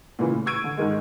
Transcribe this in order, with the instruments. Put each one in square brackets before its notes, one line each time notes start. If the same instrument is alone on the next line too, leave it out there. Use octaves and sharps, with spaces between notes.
[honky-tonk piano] A#2 C#3 E3
A2
C#6 E6 G#6 D7 D#7
D3
G#2 D#3 G#3